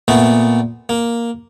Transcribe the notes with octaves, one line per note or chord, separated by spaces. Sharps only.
A#2 A3 B3
A#3